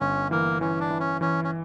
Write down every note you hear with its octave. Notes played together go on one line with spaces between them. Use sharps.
G1 C#4
E3 A#3
E3 C#4
D4
E3
C#4
E3 C#4
C#4